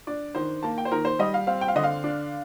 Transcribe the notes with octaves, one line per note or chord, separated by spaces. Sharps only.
D4 D5
D#3 C5
A#3 A5
G5
C5
D#3 A#4
C5
G3 D#5
F5
C4 F5
G5
F5
D3 D#5
F5
D4